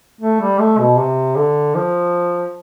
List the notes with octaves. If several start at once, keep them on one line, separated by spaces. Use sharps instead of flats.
A3
G3
A3
B2
C3
D3
F3